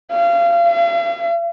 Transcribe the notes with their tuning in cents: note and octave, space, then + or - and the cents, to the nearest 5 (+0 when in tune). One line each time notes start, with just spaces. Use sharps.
F5 -30
F5 -45